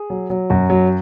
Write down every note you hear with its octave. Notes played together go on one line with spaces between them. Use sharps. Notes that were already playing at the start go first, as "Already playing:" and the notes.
Already playing: G#4
F#3
F#3
F#2 F#4
F#3